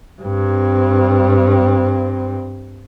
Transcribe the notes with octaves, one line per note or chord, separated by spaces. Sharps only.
G2 C4